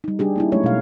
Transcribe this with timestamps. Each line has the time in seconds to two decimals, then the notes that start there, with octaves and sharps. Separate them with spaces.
0.04 G3 D#4
0.19 G3 D4 G4 G#4
0.36 A#3 D#4 E4
0.52 F#3 G#3 A3 C#4 C#5
0.64 B2 F5